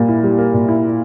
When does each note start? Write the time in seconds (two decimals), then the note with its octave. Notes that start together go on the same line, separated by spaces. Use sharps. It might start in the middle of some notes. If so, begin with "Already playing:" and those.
Already playing: A#2 G3 A#3
0.08 E4
0.23 G3
0.38 A#3
0.54 A#2
0.68 E4